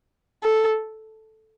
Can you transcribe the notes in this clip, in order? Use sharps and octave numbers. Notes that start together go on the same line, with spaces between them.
A4